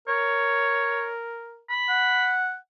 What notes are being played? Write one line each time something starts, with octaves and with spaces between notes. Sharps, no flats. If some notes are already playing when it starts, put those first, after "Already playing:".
A#4 C#5
B5
F#5